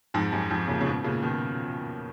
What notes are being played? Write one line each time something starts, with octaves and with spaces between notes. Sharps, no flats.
F2 G#2
F#2
F2 G#2
A#2 C#3
C#3
G#2 B2
A#2 C#3
B2 D#3